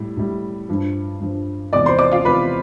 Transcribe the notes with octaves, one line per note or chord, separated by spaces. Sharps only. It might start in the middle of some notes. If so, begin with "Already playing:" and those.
Already playing: A2 G3
A2 G3
G2 F3
G2 F3
E2 C3 F3 D5 D6
C5 C6
D5 D6
F4 F5
E2 C3 F3 B4 B5